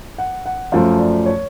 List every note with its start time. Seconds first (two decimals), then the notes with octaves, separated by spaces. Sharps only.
0.18 F#5
0.46 F#5
0.72 F#2 F3 A3 F5
0.99 D5
1.26 C#5